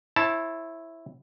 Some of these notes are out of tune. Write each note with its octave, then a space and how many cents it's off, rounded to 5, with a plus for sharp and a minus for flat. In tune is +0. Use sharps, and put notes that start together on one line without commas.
E4 +0 C5 +45 A5 +0